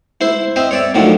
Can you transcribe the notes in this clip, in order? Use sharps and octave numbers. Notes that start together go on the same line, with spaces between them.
E4 C5 C6
C4 C5 D#5 E5
C#5 D5 E5
A2 D#3 F3 F#3 D4